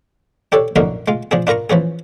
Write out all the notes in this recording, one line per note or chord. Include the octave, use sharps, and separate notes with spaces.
D4 G4 A4 C#5
A#1 F#2 D3 A#3 D#4 A#4
G#3 F4
F3 D4 G#4
D4 F4 A#4 A#5 C#6
E3 F3 C#4 G#4